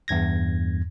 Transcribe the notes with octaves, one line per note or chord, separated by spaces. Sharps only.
E2 G2 G#6 A#6